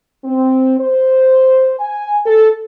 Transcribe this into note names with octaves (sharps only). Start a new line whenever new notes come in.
C4
C5
G#5
A4